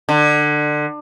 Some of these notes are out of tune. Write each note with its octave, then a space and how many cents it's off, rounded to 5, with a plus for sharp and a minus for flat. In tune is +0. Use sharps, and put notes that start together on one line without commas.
D3 +25